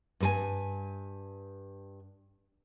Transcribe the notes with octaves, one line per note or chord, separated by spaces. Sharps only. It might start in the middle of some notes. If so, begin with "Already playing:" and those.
G2 B4 G#5